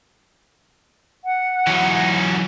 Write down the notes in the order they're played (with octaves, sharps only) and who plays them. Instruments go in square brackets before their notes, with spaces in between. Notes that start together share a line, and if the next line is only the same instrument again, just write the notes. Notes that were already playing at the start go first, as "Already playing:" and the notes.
[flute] F#5
[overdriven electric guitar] E3 F#3 [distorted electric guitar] C#4 D#4